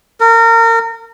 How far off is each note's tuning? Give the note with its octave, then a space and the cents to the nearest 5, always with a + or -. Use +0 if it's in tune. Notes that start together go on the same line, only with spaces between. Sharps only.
A#4 -30